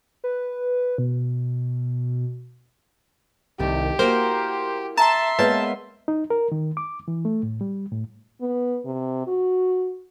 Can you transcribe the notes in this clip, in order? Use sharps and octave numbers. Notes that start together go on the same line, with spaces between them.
B4
B2
C2 D#3 A3 G4
A#3 E4 F#4 A#4 C5
E5 A5 A#5 C6
G#3 A#3 B3 B4 C#5 D5 A5
D#4
A#4
D#3
D6
E3
A3
A2
G3
A2
B3
C3
F#4